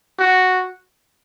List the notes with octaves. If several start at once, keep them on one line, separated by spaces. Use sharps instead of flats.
F#4